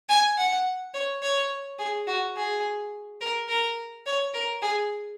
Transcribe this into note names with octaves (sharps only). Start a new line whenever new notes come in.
G#5
F#5
C#5
C#5
G#4
F#4
G#4
A#4
A#4
C#5
A#4
G#4